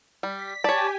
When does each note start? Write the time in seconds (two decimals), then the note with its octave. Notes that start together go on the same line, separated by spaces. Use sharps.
0.23 G3 B6
0.64 G4 C#5 D5 G#5 A5